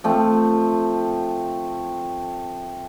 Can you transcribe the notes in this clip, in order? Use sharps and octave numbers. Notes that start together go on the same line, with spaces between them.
F3 A3 C4